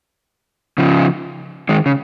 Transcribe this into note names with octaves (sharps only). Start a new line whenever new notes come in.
C#3 F3
D#3 G#3
C#3